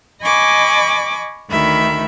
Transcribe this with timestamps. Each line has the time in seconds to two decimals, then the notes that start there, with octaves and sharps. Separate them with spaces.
0.21 D#5 G#5 B5 C#6 D6
1.50 D2 D#3 E5 B5